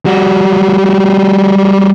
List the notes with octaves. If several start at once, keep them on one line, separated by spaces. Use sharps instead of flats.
G3 F#4